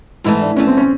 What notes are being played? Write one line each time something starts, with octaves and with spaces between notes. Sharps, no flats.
G#2 E3 A3 E4
D4
G#2 E3 A3 C#4
C4
C#4